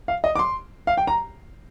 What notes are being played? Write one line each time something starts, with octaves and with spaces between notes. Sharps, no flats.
F5
D#5
D6
C6
F5
G5
A#5